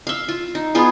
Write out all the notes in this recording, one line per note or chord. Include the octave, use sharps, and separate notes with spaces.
E5 F5
F4
D#4
B3 F4 G#4